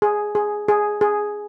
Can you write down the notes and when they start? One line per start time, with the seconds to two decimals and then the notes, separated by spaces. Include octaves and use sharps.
0.02 G#4
0.35 G#4
0.68 G#4
1.01 G#4